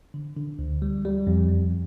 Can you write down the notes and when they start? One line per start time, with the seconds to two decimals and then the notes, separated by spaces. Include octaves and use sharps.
0.14 D3
0.36 D3
0.59 D2
0.82 G3
1.05 G3
1.27 F2
1.49 F2